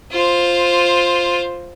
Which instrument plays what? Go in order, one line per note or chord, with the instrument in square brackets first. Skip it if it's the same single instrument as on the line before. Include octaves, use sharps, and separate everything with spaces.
[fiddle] F4 C5